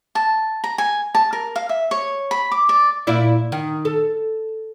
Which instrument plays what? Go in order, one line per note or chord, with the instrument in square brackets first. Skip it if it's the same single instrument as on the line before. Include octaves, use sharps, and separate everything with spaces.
[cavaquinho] A5
A#5
G#5
A5
A#4
F5
E5
C#5
B5
D6
D5
[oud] A#2 E4 D5
D#3
A4